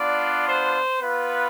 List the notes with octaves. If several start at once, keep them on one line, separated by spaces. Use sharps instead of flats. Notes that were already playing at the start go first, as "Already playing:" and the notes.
Already playing: B3 D4 F4 D5
C5
B3 F4 B4